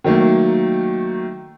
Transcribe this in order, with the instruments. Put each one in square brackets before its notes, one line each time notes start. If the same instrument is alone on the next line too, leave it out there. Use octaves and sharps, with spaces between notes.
[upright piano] D#3 F#3 A3 A#3